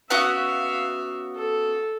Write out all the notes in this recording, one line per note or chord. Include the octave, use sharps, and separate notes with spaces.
B3 C#4 F#4 E5 F5
A4